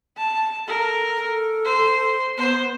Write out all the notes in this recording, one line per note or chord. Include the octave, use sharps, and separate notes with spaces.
A5
A4 A#4
A4
C5
B3 C5